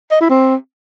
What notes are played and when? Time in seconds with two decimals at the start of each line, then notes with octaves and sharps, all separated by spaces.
0.11 D#5
0.20 E4
0.30 C4